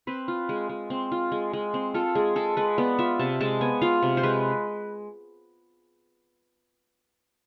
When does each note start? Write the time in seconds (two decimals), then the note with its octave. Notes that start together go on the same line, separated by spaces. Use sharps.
0.07 C4 B4
0.28 F4
0.49 G#3
0.69 G#3
0.90 C4
1.12 F4
1.32 G#3
1.53 G#3
1.74 C4
1.94 F4 A4
2.15 G#3 G#4
2.36 G#3 A4
2.57 G#3 B4
2.78 B3 D5
2.99 F4 E5
3.19 C3 A5
3.40 G#3 A5
3.61 B3 G#5
3.82 F4 F5
4.02 C3
4.17 C5
4.23 G#3 B4